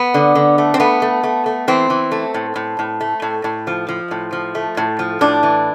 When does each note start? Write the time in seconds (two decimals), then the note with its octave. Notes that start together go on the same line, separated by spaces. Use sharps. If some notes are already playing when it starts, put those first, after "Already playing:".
Already playing: B3
0.14 D3
0.35 D3
0.58 A3
0.74 C4
0.80 A3 B3
1.02 A3
1.23 A3
1.46 A3
1.68 E3 C4
1.90 E3
2.12 A3
2.34 A2
2.56 A2
2.79 A2
3.01 A3
3.22 A2
3.44 A2
3.67 F3
3.89 F3
4.11 A2
4.33 F3
4.55 A3
4.77 A2
4.99 F3
5.21 A2 D4
5.43 E3